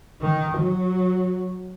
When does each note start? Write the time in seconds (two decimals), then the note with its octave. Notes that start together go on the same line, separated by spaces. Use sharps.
0.22 D#3
0.58 F#3